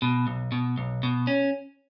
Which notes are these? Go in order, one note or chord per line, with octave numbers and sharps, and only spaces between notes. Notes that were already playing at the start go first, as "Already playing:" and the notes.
B2
B1
B2
B1
B2
C#4